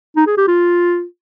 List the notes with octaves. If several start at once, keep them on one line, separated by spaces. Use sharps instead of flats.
D#4
G#4
G4
F4